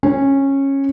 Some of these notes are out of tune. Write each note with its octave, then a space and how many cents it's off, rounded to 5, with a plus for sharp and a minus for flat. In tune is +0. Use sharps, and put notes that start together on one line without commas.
C#4 -15